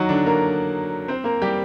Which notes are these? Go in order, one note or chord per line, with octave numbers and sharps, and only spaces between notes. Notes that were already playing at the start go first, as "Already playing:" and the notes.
Already playing: D#3 F#3 D#4 F#4
D3 D4
A#3 A#4
C4 C5
A#3 A#4
G3 G4